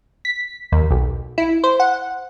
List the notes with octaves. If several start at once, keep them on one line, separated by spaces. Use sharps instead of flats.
B6
D#2
B1
E4
C5
F#5